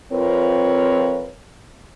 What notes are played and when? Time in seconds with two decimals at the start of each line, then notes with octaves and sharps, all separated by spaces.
0.12 F2 C4 F4 A#4 B4 C#5